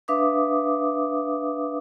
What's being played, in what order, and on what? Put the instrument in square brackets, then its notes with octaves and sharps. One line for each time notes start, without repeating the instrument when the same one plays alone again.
[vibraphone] D4 B4 E5 F5 D6 D#6